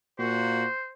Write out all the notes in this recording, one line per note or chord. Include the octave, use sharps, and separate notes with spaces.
A#2 A#3 F#4 C5